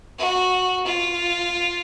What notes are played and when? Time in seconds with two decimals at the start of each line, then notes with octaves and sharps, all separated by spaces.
0.18 F#4
0.85 F4